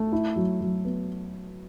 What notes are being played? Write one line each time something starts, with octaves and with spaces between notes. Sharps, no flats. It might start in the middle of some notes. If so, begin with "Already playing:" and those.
Already playing: A3
E4
F#3
F#3
B3